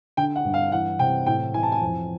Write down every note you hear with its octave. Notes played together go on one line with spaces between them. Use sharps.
D3 G5
F#5
G2
F5
E3 F#5
C3 G5
A2 G5
E3 G#5
A5
G#5
F2